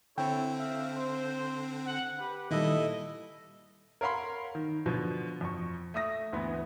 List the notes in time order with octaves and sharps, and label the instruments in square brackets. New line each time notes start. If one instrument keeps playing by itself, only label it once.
[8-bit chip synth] D3 C4 [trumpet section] E4 A4 C#5 [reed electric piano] G5
[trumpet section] E5 F5
C5
F#5
G4 B4
[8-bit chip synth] A#2 E4 [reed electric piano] D#3 G3 [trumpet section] A4 D#5
[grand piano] A#4 C#5 F5 F#5 B5 C6
D#3
B2 D3 F3
F2 C#6
A3 E5 D#6 A#6
D2 E3 B3 B5